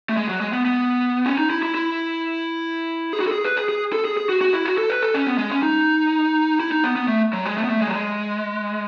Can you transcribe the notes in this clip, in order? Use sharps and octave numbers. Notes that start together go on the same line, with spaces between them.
A3
G#3
F#3
G#3
B3
B3
C#4
D#4
E4
E4
E4
G#4
F#4
A4
G#4
B4
G#4
G#4
A4
G#4
G#4
F#4
F#4
E4
F#4
A4
B4
A4
C#4
B3
G#3
C#4
D#4
E4
D#4
B3
B3
A3
F#3
G#3
A3
B3
A3
G#3
F#3
G#3